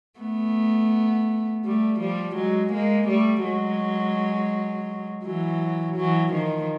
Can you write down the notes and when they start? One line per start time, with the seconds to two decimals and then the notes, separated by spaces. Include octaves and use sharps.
0.20 A3 B3
1.65 G3 A3
2.00 F3 G3
2.36 F#3 G#3
2.72 G#3 A#3
3.08 G3 A3
3.44 F#3 G#3
5.24 E3 F#3
5.96 E3 F#3
6.32 D#3 F3